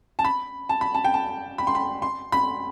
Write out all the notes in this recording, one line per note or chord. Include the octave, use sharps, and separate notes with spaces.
A5
B5
A5
B5
A5
G5
A5
B5
C6
B5
C6
B5